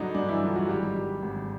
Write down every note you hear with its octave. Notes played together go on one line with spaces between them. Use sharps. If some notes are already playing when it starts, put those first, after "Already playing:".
Already playing: G2 D3 F#3 D4 D#4
G2 D4
E3 E4
D3 F#3 F4
F#3 F#4
G#1 G3 G4
G2 D#3
G#1